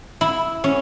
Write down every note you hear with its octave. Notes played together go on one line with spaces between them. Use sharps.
E4
C#4